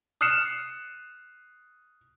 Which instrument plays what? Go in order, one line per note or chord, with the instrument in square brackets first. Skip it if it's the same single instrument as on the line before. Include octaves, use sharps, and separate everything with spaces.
[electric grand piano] D#6 F6 F#6 C7 C#7 E7